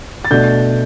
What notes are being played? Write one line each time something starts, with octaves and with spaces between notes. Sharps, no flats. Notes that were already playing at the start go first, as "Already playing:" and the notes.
A6
B2 A3 D4 G6